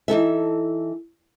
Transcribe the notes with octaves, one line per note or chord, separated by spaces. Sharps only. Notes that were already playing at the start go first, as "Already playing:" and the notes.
E3 D#4 A4 E5